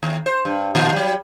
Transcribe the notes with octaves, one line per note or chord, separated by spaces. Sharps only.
D#2
C5
G2
A#2 D#3 F3
F#3 G3